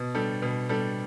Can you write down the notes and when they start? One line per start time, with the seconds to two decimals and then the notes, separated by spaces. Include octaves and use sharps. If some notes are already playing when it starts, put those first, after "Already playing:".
Already playing: B2
0.15 G3 D4 A4
0.42 B2
0.69 G3 D4 A4